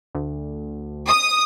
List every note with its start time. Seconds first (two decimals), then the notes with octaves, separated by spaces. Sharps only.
0.15 D2
1.09 D#6